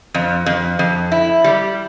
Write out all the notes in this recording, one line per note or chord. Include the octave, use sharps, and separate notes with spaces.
F2
F2
F2
E4
G3